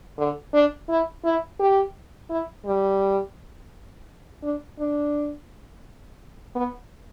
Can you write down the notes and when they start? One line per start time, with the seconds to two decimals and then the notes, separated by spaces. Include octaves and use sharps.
0.18 D3
0.53 D4
0.89 E4
1.24 E4
1.59 G4
2.30 E4
2.66 G3
4.43 D4
4.79 D4
6.55 B3